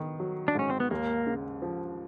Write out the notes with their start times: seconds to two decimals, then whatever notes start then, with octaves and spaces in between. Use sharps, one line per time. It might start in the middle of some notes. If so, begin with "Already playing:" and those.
Already playing: D#3 B3
0.20 F#3
0.48 D4
0.55 G#2 C#4
0.70 C4
0.80 B3
0.91 D#2 A#3
1.27 C#3
1.62 F3